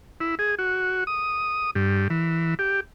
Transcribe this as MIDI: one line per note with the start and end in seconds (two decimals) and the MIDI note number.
0.20 0.35 64
0.39 0.55 68
0.59 1.04 66
1.07 1.71 87
1.75 2.08 43
2.10 2.55 52
2.59 2.80 67